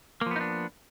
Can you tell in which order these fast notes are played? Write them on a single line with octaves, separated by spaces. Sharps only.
A#3 F3 B3 D#4 D4